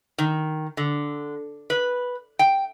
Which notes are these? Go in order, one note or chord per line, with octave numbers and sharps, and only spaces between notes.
D#3
D3
B4
G5